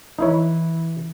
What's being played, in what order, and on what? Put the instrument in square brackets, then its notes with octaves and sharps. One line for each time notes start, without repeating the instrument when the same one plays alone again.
[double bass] E3 [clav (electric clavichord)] D#4 E4 C#5